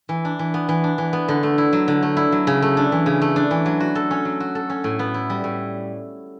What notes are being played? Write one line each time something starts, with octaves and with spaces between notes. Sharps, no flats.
E3
D4
E3
B3
E3
D4
E3
B3
D3
A3
E4
F#3
D3
A3
E4
F#3
C#3
A3
D4
E3
C#3
A3
D4
E3
F#3
F#4
A4
C#4
F#3
F#4
A4
C#4
A2
B3
E4
G3
A2